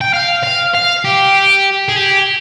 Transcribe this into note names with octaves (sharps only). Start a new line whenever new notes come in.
G5
F5
F5
F5
G4
G#4
G4